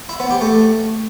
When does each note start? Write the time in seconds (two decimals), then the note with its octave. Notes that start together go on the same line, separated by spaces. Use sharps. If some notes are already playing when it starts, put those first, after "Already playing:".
0.09 E4
0.20 B3
0.31 G4
0.41 A3